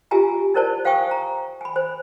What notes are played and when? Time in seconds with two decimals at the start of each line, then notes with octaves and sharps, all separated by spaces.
0.11 F4 G4 E5 G#5 A#5
0.54 D#4 E4 A#4 C5 D5 A5
0.85 C5 F5 G5 G#5 C#6 D#6
1.11 A#5
1.61 G#5 B5
1.76 C5